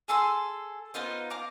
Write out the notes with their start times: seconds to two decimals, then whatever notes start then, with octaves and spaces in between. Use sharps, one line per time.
0.08 G#4 A4 C6 E6
0.94 B3 D#4 F4 C5
1.30 F5 A#5 D6